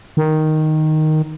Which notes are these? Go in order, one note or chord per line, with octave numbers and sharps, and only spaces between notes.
D#3